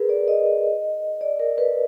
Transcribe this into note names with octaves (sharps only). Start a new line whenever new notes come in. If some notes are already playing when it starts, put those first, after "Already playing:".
Already playing: G#4 A#4 B4
D5
D#5
D#5
D5
A#4
B4